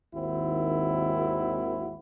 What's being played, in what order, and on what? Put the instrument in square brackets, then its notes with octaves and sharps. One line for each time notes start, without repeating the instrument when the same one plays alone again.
[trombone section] G#1 D#2 D#3 C4 E4 F#4